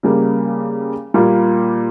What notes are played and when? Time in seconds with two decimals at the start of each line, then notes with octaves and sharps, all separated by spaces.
0.03 C#3 G3 A#3
1.14 A#2 G3 A#3 F4